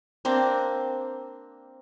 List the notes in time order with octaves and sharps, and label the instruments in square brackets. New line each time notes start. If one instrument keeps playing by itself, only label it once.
[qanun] A#3 C4 D4